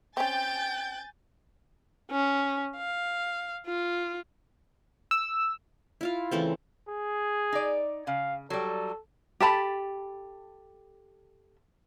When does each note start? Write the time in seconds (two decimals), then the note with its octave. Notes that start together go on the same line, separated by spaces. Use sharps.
0.17 C4 C#4 G5 G#5 G6 A6
2.11 C#4
2.77 F5
3.66 F4
5.11 E6
6.01 E4 F4 F5
6.31 C#3 E3 A3 C4
6.88 G#4
7.52 D#4 D5
8.07 C#3 F5
8.50 F#3 G3 A4
9.40 G4 A4 A5 B5